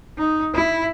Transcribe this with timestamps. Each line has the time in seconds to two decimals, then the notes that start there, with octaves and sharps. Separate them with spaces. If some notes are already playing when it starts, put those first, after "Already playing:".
0.18 D#4
0.54 E4